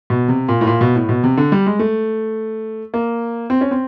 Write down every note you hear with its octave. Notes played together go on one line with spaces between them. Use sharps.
B2
C3
A#2
A2
A#2
B2
A2
B2
C3
D3
G3
G#3
A3
A#3
C4
C#4
C4